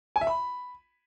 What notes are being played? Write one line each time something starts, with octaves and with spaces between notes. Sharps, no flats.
G#5
E5
B5